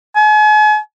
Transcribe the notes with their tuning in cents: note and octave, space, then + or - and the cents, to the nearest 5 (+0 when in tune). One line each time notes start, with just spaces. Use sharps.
G#5 +40